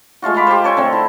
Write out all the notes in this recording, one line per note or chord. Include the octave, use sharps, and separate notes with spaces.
G#3 A3 F4 F#4
F5 A#5 B5 D6
G4 C5
A4 C#5 G5 G#5
D3 A3 C4
E4